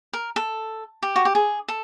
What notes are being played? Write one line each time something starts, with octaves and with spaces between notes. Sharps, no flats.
A#4
A4
G4
F#4
G4
G#4
A4